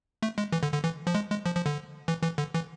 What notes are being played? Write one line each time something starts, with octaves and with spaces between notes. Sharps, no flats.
A3
G#3
E3
D3
D3
E3
F3
G#3
G#3
F3
F3
D3
E3
E3
D3
E3